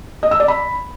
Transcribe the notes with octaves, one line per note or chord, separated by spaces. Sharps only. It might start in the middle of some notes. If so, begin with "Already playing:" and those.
D#5
E6
D5
B5